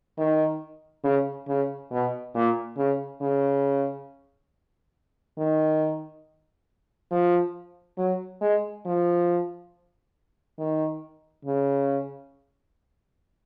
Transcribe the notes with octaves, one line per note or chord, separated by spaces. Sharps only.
D#3
C#3
C#3
B2
A#2
C#3
C#3
D#3
F3
F#3
G#3
F3
D#3
C#3